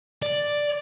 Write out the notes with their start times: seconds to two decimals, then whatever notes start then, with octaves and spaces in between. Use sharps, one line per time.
0.22 D5